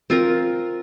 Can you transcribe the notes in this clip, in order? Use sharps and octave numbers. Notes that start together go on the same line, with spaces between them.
C4 F4 A#4